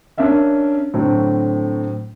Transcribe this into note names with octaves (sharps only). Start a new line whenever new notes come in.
C#4 D4 A#4 E5 F5
A2 D3 F#3 C4 D4